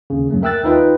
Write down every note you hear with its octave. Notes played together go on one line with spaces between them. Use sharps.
D#2 C#3
F#2 F#3 A3 A#3
A#4 E5 G5 E6 F#6 A6
D#2 D#4 F4 B4 D#5 G5